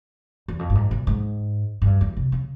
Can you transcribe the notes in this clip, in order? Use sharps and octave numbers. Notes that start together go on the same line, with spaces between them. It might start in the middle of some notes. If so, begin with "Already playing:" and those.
E2
F2
G2
G#2
A#2
G#2
G#2
G2
E2
C3
C#3